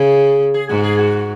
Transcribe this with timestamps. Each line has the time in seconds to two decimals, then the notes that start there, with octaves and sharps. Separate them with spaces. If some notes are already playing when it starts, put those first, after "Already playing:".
Already playing: C#3 G#4
0.54 G#4
0.69 G#2 F#4
0.84 G#4
0.98 F#4